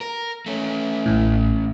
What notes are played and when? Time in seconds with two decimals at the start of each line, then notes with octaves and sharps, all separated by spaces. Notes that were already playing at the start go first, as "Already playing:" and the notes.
0.01 A#4
0.46 A3 C#4
1.06 A1 A2